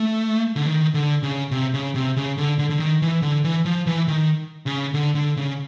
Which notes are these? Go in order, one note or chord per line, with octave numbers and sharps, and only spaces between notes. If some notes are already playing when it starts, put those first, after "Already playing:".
Already playing: A3
D3
D#3
D3
C#3
C3
C#3
C3
C#3
D3
D3
D3
D#3
E3
D3
E3
F3
E3
D#3
C#3
D3
D3
C#3